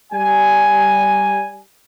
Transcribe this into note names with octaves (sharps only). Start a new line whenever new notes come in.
G3 G#5